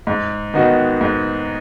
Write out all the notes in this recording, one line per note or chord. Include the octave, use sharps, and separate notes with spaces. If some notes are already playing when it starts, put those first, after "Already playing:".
G#2
D#3 B3 D#4 F#4
G#2